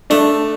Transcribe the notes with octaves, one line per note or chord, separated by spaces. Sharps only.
A3 D4